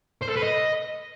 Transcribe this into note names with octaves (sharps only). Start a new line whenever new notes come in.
C5
A4
B4
D#5